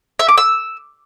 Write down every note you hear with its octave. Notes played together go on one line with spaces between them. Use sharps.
E5
D6
E6